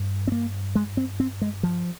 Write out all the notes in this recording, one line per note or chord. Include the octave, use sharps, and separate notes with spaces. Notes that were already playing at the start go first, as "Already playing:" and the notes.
Already playing: G2
C4
A#3
G#3
C4
C4
G#3
F3